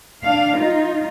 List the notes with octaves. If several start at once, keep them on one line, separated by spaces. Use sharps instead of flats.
D4 F5
D#4 F4